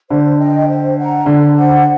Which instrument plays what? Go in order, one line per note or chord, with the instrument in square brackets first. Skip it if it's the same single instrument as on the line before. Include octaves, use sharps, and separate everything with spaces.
[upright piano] D3 [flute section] C5
[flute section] D#5 G5
C5
F#5 A#5
[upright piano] D3 [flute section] A4
[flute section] C5 F#5